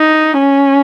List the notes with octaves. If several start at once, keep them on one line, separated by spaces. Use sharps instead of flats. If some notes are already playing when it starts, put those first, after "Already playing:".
Already playing: D#4
C#4